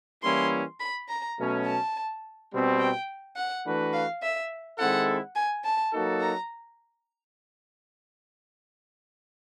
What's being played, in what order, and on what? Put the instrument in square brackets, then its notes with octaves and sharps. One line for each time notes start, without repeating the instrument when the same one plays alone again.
[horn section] E3 G3 A#3 C#4 E4 [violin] C6
[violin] B5
A#5
[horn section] B2 F#3 A3 C#4
[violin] A5
[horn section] B2 G3 C4
[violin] G5
F#5
[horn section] E3 A3 D4 F#4 B4
[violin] F5
E5
[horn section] D#3 G#3 C4 E4 A4 [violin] F#5
[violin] G#5
A5
[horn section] F#3 A#3 D#4 F#4 A4
[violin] A#5